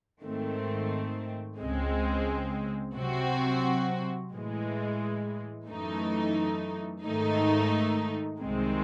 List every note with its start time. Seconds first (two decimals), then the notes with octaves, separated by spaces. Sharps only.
0.22 G#2 D#3 A3 C4
1.59 C#2 C#3 G#3 C4
2.96 C3 F#3 C4 F#4
4.31 A2 E3 G#3
5.68 F#2 E3 A3 D#4
7.04 G#2 D#3 A3 D#4
8.41 C2 C3 D#3 G#3 C4